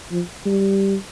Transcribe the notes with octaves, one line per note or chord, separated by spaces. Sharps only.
F3
G3